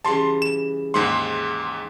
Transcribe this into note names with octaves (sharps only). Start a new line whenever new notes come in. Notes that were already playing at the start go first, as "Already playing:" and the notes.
C#3 E3 G3 A5 C6
E7
D#2 G#2 E5 F#5 C6